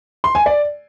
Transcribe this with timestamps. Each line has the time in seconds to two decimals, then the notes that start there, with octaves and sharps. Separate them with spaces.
0.24 C6
0.35 G#5
0.46 D5